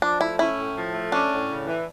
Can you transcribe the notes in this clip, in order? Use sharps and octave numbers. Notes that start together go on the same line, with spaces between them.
F3 D4
A3 E4
C#4 E4
A2
F3
A3
C#4 D4
A2
C#3
E3